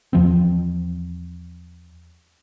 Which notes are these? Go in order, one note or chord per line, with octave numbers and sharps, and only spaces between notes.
E2 F3 C4